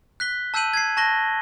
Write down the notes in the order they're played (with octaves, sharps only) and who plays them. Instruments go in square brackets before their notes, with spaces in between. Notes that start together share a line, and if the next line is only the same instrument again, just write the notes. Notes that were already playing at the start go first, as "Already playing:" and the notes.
[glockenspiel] F#6 B6 G7
A5 E6 G6 C7 D#7 F#7
G#6 C7
A5 C#6 F#6 A#6 F#7 G7